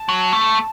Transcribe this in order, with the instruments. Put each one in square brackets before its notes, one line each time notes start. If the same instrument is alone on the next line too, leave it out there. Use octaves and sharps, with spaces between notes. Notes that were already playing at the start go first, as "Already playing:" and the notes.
Already playing: [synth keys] A5
[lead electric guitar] F#3
A3